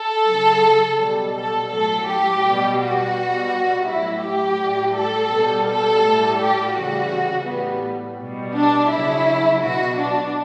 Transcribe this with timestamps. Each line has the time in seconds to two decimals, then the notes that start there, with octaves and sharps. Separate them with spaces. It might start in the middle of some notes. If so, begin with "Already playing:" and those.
Already playing: A4
0.26 C#3 F#3
0.98 B2 G3
1.35 A4
1.71 A2 F#3 A4
2.06 G4
2.42 B2 G3
2.79 F#4
3.15 B2 G3
3.86 A2 F#3 E4
4.23 G4
4.59 A2 G3
4.95 A4
5.30 B2 G3
5.67 A4
6.02 A2 G3
6.38 G4
6.74 C#3 E3 G3 F#4
7.46 A2 G3 B3
8.19 B2 G3
8.55 D4
8.90 C#3 F#3 E4
9.62 B2 F#3 F#4
9.99 D4